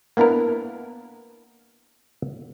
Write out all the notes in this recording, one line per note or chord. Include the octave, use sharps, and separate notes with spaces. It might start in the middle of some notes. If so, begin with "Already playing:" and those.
A#3 B3 D4 E4 A#4